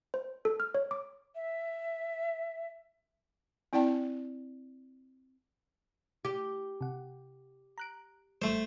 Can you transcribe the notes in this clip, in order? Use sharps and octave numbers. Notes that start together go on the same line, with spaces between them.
C5
A4
F6
C#5
D6
E5
C4 E4 D5 G5 A5
G4
C3 F#5
A#5 F#6 D7
G#1 G3 A3 C5